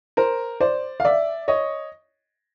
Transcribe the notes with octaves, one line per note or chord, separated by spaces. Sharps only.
A#4 C5
C5 D5
F5
D5 E5
C#5 D#5